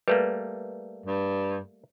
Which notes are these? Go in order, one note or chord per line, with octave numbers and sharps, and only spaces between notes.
G3 A3 A#3 B4
G2